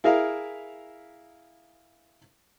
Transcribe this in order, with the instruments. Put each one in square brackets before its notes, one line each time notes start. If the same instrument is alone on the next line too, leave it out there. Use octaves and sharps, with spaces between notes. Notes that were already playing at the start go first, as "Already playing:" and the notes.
[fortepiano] E4 G#4 A#4 E5 F5